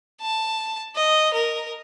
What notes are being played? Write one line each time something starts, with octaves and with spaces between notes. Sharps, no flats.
A5
D#5
A#4